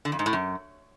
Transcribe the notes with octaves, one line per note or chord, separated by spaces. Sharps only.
D3
F2
G#2
A2
F#2